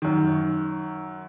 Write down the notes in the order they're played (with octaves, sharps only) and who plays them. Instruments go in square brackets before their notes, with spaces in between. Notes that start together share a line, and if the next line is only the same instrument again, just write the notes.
[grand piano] F#2 D#3